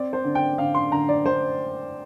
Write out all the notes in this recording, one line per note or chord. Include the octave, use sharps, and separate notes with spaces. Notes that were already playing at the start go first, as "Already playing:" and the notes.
Already playing: C4 D5
C5
D3
G5
D3 F5
C6
D3 A#5
D5
D3 C5